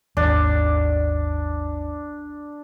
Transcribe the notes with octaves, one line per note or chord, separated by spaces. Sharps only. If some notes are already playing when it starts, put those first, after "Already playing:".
G#1 D#2 D4